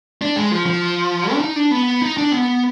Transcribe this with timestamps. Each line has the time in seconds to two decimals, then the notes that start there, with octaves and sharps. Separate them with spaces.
0.22 D4
0.36 G#3
0.51 F3
0.66 F3
1.32 D4
1.41 D#4
1.56 D4
1.71 B3
2.02 D#4
2.17 D4
2.31 B3